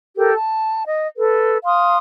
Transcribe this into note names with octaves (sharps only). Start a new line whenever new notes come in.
G4 A4 A#4
A5
D#5
A4 B4
F5 C6 D#6